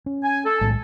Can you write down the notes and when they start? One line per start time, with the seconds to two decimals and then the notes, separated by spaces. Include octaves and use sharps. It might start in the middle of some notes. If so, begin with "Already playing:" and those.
0.06 C#4
0.24 G#5
0.45 A4
0.61 B1 A2 G#3